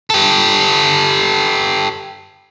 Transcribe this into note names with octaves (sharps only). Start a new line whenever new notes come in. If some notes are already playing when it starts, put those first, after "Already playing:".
G4 A4